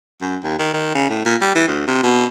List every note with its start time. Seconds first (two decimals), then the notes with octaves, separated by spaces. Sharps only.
0.21 F#2
0.43 D#2
0.59 D#3
0.74 D#3
0.95 C#3
1.10 A2
1.25 A#2
1.41 G3
1.55 E3
1.68 D2
1.87 C3
2.03 B2